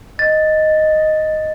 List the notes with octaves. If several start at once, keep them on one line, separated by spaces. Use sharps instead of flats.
D#5 A6